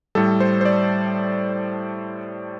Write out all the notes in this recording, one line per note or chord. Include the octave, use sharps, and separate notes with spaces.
A2 G3 A4
C5
C5
D5